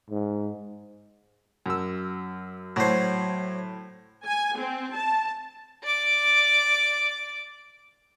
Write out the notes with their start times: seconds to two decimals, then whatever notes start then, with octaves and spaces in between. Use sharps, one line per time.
0.10 G#2
1.66 F#2 E6
2.76 A2 F#3 C5
4.26 G#5
4.58 C4
4.95 A5
5.83 D5 D6